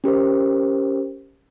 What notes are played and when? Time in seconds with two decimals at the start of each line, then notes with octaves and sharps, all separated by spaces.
0.04 C#4 G4 A#4 C5